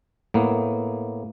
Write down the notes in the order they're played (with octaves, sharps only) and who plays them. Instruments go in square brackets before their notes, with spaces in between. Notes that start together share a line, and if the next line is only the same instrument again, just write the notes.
[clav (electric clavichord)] A2 A#3 B3